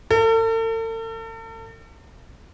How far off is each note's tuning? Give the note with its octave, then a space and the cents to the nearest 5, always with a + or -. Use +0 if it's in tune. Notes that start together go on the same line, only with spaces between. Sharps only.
A4 +45